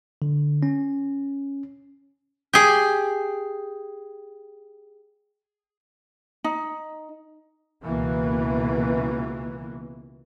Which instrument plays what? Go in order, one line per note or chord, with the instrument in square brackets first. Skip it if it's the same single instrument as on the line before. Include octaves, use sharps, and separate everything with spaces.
[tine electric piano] D3
C#4
[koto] G4 G#4
[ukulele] D#4
[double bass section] C#2 B2 E3 A#3 B3